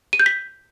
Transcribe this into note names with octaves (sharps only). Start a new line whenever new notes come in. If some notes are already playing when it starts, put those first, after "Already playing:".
D#7
G6
B6